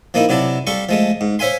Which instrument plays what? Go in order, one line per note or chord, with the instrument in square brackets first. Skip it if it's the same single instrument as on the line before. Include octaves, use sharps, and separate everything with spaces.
[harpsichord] F3 A#3 D#4 E4
C3 F#3 E4 D5 A5
G3 A4 F5 C6 C#6
F3 G#3 A3
G#2
C5 C#5 E5 F5 G#5 C6